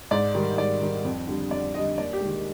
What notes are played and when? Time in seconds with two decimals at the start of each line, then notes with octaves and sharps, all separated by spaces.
0.11 G#2 D5
0.35 D#3 G3
0.57 G#2 D5
0.81 D#3 G3
1.05 F2
1.27 D3 G3
1.51 F2 D5
1.74 D3 G3 D#5
1.98 D#2 D5
2.13 G4
2.20 G#3
2.25 D#3 G4